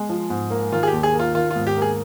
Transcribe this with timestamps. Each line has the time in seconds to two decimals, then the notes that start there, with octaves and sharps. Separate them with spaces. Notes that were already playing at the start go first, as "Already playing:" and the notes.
Already playing: G#3
0.09 F3
0.30 G#2
0.51 A#3
0.72 D#3 F4
0.83 G#4
0.88 G4
0.93 D#2
1.03 G#4
1.14 A#3
1.19 F4
1.35 D#3 F4
1.50 F4
1.56 G#2
1.67 G4
1.77 A#3 G#4